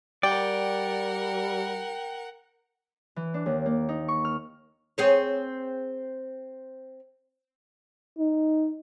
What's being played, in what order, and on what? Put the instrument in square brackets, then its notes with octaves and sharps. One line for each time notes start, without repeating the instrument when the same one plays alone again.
[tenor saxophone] G3 [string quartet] A#4 F#5 [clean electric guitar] D5 [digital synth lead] G5
[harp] E3
D4
D#2
A#3
D#4
C#6
F6
[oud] C4 G#4 C#5
[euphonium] D#4